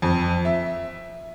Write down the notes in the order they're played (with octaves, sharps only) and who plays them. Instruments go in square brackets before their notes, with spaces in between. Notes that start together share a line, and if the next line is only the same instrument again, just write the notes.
[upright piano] F2
E5